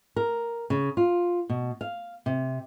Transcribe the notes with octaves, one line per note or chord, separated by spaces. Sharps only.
A#4
C#3
F4
B2
F5
C3